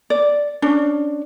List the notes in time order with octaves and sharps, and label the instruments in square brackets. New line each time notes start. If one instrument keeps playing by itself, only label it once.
[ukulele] D5
C#4 D4